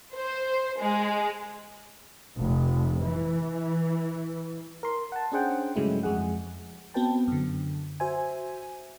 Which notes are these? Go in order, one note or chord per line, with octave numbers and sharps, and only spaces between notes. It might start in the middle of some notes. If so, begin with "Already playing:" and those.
C5
G#3
F1
E3
A#4 C6
F#5 A5
C#4 D4 G#4 C5 F#5 G5
G2 C#3 F#3 G#3 A3 E4
F2 G#3 G#4 F#5
B3 C4 F#4 B4 G5 A5
F#2 D3
F#4 C5 E5 G#5